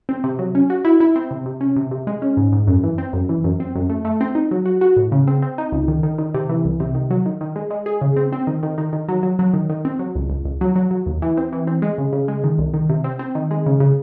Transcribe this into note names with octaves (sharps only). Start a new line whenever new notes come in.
C4
C3
F#3
C#4
F#4
E4
E4
C4
C3
C3
C#4
C3
C3
G#3
C#4
G#2
G#2
F#2
E3
C4
F#2
E3
F#2
C4
F#2
A3
A3
C4
D#4
F#3
F#4
F#4
A2
C#3
C4
C4
D#4
C#2
D#3
D#3
D#3
C3
E3
C2
C3
D#3
F#3
D#3
D#3
G#3
G#3
G#4
C#3
C4
C4
D#3
D#3
D#3
D#3
F#3
F#3
F#3
D#3
D#3
C4
F#3
C#2
C#2
C#2
F#3
F#3
F#3
D#2
E3
C4
E3
C4
G#3
C#3
C#3
G#3
D#3
C2
D#3
C3
C4
C4
D#3
G#3
C#3
C#3